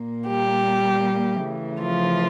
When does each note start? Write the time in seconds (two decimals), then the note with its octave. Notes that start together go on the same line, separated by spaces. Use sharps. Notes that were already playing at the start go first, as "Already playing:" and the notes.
Already playing: A#2 A#3
0.27 G3 G4
1.43 C#3 E3 A3
1.81 F3 F4